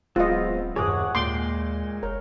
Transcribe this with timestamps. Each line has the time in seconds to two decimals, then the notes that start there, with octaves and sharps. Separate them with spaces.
0.16 D1 F#3 G#3 B3 C4 F4 D#5 F5
0.76 D#1 F#2 G#4 C#5 F#5 D6
1.15 D#2 A#2 G#3 G5 C6 D6
2.03 F#1 A#4 C#5